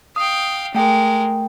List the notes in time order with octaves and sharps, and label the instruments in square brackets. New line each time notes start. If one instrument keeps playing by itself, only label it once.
[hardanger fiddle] F5 G5 [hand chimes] D#6
[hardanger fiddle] G#3 A#4 [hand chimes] A3 G5